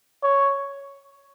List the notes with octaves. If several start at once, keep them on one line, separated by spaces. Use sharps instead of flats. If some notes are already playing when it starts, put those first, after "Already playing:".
C#5